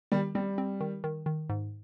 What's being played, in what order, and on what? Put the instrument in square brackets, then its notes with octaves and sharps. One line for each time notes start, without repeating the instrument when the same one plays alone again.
[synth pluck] D#3 [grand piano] G3
[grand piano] G3 [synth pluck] C4
[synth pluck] C4
D#3
D#3
D#3
G#2